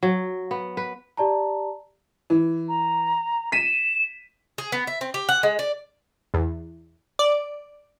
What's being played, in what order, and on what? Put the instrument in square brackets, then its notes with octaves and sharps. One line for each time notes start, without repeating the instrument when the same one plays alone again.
[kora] F#3
B3
B4
[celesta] G4 D5 A5 A#5
[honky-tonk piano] E3
[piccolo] A#5
[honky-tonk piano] B6 D#7 [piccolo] E7
[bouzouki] G#4
B3
E5
C4
G4
F#5
G#3
D5
[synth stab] E2
D5